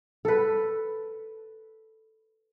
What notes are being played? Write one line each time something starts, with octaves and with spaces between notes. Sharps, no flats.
A4 B4